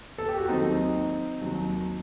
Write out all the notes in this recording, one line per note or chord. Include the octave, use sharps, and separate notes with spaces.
A4
G4
F#4
D#2 D#3 F#3 C4 D#4
D#2 D#3 F#3